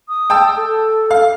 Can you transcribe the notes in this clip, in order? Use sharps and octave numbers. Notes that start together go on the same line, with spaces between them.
D#6
G5 A5 E6
A4
F5